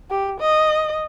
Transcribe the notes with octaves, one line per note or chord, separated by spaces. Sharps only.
G4
D#5